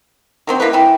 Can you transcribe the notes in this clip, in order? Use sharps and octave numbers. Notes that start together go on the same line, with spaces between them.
D#3 F#3 C4
A#3 E4 B4
E3 E4 G5